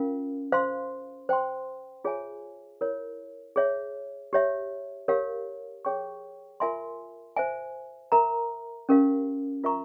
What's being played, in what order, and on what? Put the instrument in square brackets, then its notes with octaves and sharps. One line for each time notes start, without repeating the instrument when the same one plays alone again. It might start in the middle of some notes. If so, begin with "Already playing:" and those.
Already playing: [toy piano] C#4 F4 A#4 F5
C5 F5 C6
C5 G5 C6
F4 G#4 C#5 E5 G#5
E4 A#4 C#5
G#4 C#5 E5
G4 C#5 E5
G4 A#4 C#5 F5
G#4 C#5 G5 C#6
F4 A#4 E5 G#5 C6
C5 E5 G#5
A#4 E5 A#5
C#4 G4 A#4 F5
F4 A#4 E5 A#5 C#6